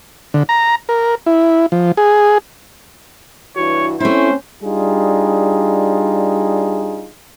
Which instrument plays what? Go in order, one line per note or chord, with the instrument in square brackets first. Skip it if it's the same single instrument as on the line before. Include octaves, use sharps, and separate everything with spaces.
[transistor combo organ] D3
A#5
A#4
E4
F3
G#4
[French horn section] G2 E3 F#4 [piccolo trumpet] C#5
[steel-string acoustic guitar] A3 E4 [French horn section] C4 C#4 [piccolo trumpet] C5
[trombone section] G3 D4 D#4 F4 G#4